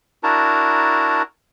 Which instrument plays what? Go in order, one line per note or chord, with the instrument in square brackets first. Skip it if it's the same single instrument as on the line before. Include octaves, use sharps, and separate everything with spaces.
[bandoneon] D4 E4 F#4 A#4 A5 A#5